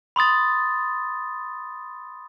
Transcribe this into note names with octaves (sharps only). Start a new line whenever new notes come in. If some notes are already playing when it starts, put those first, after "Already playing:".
B5 C6 D#6 A6